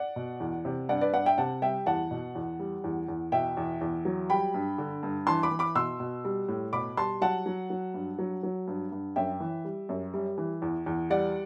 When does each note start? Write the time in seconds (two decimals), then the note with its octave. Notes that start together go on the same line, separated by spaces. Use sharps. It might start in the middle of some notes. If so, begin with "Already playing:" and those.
Already playing: D5 F#5
0.16 B2
0.40 E2
0.65 C3
0.89 G2 D5 F#5
1.01 B4 D5
1.13 G2 D5 F#5
1.26 E5 G5
1.38 C3 F#5 A5
1.62 G3 E5 G5
1.86 E2 F#5 A5
2.11 B2
2.35 E2
2.59 G3
2.84 E2
3.08 E2
3.32 B2 E5 G5
3.57 E2
3.81 E2
4.05 F#3
4.30 G3 G5 B5
4.54 G2
4.78 D3
5.03 G2
5.27 E3 A5 C6
5.43 B5 D6
5.51 E3
5.59 B5 D6
5.75 B2 C6 E6
6.00 B2
6.25 G3
6.48 A2
6.73 B2 B5 D6
6.97 G3 A5 C6
7.21 F#3 F#5 A5
7.46 F#3
7.70 F#3
7.94 G2
8.19 F#3
8.43 F#3
8.67 G2
8.92 G2
9.16 F#2 E5 G5
9.40 E3
9.65 G3
9.89 F#2
10.13 G3
10.38 E3
10.62 E2
10.86 E2
11.10 G3 D5 F#5